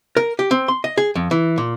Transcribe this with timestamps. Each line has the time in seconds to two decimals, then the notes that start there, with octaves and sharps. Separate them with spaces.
0.17 A#4
0.39 G4
0.51 C4
0.68 C6
0.84 D#5
0.98 G#4
1.15 F2
1.31 E3
1.58 A#2